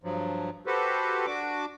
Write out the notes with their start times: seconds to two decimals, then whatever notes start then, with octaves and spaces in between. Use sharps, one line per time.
0.03 G2 F3 F#3
0.67 F#4 G4 A4 B4 C5
1.26 D4 F#4 D6